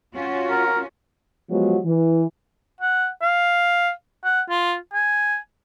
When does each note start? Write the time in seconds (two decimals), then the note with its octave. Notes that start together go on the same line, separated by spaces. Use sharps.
0.14 C#4 F4 F#4
0.50 A#4
1.50 F3 F#3 G#3 B3 G4
1.85 E3
2.81 F#5
3.22 F5
4.24 F#5
4.49 F4
4.94 G#5